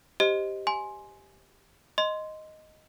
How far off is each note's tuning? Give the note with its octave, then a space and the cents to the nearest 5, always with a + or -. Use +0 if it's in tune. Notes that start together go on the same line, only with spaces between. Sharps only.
G4 +0 C5 +0 D#5 +0
G#5 +15 C6 +5
D#5 +0 C6 -10